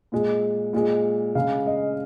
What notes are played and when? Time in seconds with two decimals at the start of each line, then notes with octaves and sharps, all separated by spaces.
0.12 A#2 G#3
0.73 A#2 G#3
1.35 C#3 G#3 F5
1.66 D#5